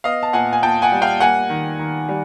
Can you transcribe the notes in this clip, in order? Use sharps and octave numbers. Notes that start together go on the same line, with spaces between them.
B3 D#5 F5
A5
A#2 F#5 G#5
G#5
A#2 G5 A5
F#5 G#5
G3
F5 G5
A#3 F#5 G#5
D#3
D#3
G3